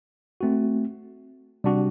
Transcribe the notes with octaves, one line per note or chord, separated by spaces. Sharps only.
A3 C4 F#4
C3 G3 D4 F#4